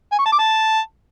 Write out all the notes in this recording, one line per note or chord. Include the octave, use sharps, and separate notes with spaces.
G#5
C#6
A5
D6
A5